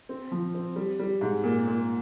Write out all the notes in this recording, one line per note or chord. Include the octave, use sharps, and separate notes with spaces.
C4
F3
C4
G3
G3
G#2
A#2
A#2